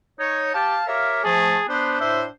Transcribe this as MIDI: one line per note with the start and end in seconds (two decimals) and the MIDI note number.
0.19 0.52 63
0.19 0.51 73
0.55 0.76 67
0.55 1.10 77
0.55 0.84 81
0.87 1.24 67
0.87 1.24 70
0.87 1.24 73
0.87 1.24 76
1.24 1.56 53
1.24 1.56 57
1.24 1.65 68
1.24 1.61 81
1.69 1.98 59
1.69 2.31 62
1.69 1.96 72
2.00 2.23 45
2.00 2.23 72
2.00 2.22 76